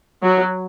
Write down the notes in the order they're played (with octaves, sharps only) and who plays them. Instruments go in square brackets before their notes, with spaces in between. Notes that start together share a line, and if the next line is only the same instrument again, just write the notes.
[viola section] F#3